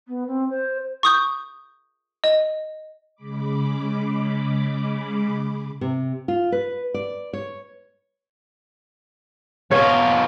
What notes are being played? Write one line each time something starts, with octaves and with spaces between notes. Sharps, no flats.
B3
C4
C5
C#6 D#6 G6
D#5
C#3 G#3 B5 D6
C3
F4
B4
D5
C#5
B2 F4 C#5